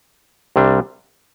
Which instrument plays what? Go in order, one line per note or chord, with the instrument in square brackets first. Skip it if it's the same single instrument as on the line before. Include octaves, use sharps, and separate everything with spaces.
[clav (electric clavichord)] C2 C3 G3 D4